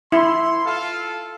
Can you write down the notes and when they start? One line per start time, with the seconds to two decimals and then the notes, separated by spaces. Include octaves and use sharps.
0.12 E4 C6
0.65 F4 A4 F5